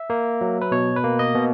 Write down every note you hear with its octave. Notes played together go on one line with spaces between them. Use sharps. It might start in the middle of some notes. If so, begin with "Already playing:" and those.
Already playing: E5
A#3
F#3
B4
B2 C#5
B4
A#3
D#5
B2